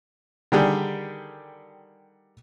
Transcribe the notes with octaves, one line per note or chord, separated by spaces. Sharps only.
D3 D#3 G3 G4 G#4